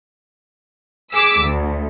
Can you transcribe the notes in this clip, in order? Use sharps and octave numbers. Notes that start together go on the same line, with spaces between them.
G#4 D6 E6 B6
D2